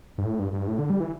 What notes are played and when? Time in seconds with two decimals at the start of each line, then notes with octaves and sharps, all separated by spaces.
0.18 G2
0.24 A2
0.39 G2
0.53 G2
0.68 A2
0.79 D3
0.90 G3
1.00 E3